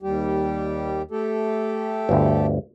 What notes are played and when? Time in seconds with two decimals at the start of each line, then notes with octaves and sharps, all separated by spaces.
0.02 D#2 G3 G4
1.11 A3 G4 A4
2.09 G1 D2